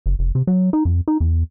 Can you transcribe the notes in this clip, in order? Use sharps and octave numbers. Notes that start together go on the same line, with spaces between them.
F#1
F1
C3
F#3
D#4
F2
D#4
E2